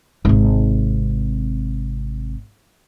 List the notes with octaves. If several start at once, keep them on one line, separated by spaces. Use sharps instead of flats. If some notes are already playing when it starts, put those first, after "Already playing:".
G#1 C3